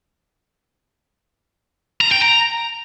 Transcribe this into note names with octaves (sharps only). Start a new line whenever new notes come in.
A#5
G5
A#5